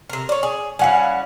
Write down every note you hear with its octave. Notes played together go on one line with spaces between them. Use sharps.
C3 A#4
C#5 D5
G#4
G3 C#4 E4 F5 F#5 G#5